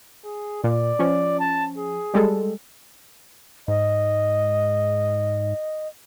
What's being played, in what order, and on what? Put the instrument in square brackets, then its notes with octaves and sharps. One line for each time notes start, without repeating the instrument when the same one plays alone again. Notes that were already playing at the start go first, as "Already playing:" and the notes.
[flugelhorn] G#4
[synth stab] A#2 [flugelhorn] D5
[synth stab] F3 C#4
[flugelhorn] A5
G#4
[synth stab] G3 G#3 A4
[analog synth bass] G#2 [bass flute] D#5